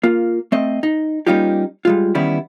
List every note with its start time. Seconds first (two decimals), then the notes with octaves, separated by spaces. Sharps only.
0.03 A#3 F4
0.52 A3 C4 D#5
0.83 D#4
1.27 G3 A#3 C#4 D#4 F4 G4
1.85 G3 G#3 F4
2.15 D#3 E3 G3 B3 C#4 E4